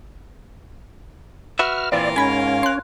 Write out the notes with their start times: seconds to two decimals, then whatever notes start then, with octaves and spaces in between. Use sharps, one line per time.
1.59 F#4 B4 E5 F6
1.92 A#2 E3 C4 F4 A#4 D5 F5
2.16 G#2 C#4 G#5 B5 G#6
2.63 C6 F#6